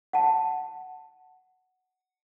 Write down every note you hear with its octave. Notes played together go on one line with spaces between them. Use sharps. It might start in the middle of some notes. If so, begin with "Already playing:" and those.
F#5 A5